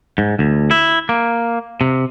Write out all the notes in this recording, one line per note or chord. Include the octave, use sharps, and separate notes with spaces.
G#2
D2
E4
A#3
C3